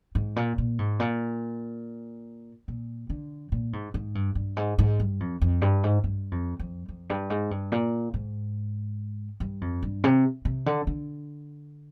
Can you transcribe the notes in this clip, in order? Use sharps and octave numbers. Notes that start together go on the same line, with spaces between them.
G#2
A#2
A#2
G#2
A#2
A#2
D3
A#2
G#2
G#2
G2
G2
G#2
G#2
G2
F2
F2
G2
G#2
G2
F2
F2
F2
G2
G#2
G2
A#2
G#2
G2
F2
G2
C3
C3
D3
D3